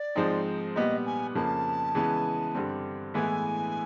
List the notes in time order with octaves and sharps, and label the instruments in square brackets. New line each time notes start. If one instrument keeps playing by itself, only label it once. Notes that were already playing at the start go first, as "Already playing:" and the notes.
Already playing: [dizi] D5
[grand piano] G#2 F3 G#3 C4 D#4
[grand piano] A#2 G3 B3 [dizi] D#5
[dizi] G#5
[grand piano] F2 C#3 F3 A#3 [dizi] A5
[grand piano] C#3 E3 G#3 B3
G2 D3 G3 C4
[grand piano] A2 E3 G#3 B3 E4 [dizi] G#5